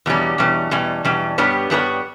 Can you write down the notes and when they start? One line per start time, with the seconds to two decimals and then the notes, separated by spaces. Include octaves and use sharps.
0.06 E2 B2 G3 C#4
0.38 E2 B2 G3 C#4
0.71 E2 B2 G3 C#4
1.05 E2 B2 G3 C#4
1.38 G2 G3 B3 G4 C#5
1.70 G2 G3 B3 G4 C#5